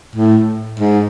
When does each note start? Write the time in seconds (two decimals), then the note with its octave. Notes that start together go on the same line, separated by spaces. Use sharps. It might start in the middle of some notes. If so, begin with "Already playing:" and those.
0.16 A2
0.80 G#2